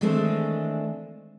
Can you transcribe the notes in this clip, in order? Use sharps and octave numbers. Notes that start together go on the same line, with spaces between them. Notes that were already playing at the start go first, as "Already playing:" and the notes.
D#3 E3 G#3 A3 C4 D4